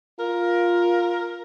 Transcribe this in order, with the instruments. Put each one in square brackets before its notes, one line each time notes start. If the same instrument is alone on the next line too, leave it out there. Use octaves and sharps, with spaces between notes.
[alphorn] F4 [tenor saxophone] A#4